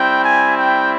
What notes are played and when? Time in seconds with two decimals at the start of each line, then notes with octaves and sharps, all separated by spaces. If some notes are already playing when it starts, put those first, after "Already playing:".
Already playing: G3 C4 E4 G5
0.24 G#5
0.58 G5